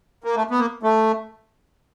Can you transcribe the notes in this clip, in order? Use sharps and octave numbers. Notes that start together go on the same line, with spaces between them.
A#3
A3
B3
A#3
A3